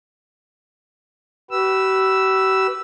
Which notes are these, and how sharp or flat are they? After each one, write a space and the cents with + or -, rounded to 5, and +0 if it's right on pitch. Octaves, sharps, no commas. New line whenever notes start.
G4 -45 B4 -5 E6 +0